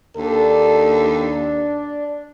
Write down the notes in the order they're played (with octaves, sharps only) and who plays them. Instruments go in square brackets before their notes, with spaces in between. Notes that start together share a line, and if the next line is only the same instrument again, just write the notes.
[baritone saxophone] D#2 [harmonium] D4 [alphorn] A4